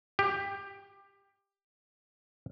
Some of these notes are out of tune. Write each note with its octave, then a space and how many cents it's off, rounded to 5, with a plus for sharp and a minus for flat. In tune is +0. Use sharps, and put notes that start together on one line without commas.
G4 +15